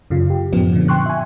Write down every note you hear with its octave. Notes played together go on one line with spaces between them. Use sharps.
F#2 C#3 F4
G4
F#2 A2 F3 B3 C#4
A#2 D3
G5 C6 C#6 F#6
E5 G#5